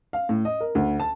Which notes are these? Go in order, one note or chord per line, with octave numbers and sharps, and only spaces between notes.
F5
A2
D#5
A#4
D2
A5